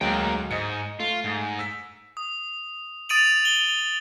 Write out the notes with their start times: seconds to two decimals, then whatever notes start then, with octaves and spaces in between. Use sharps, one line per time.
0.01 D2 F#3 G#3 A#3 G5
0.51 G#2 D#5 C#7
1.00 A3 F4
1.24 G#2
1.59 E6 B6
2.17 D#6
3.09 D#6 A6 D7 D#7 F7 F#7
3.45 G7